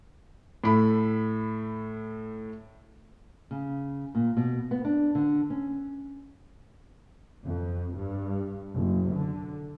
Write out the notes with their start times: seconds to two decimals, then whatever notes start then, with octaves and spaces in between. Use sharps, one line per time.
0.64 A2 A3 B5
3.51 C#3
4.15 A#2
4.37 B2
4.71 B3
4.85 D4
5.15 D3
5.50 C#4
7.44 F2
7.96 G2
8.75 F#1
9.15 D3